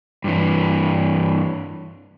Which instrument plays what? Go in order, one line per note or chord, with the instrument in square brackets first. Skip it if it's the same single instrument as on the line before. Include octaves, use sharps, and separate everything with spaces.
[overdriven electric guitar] G2 E3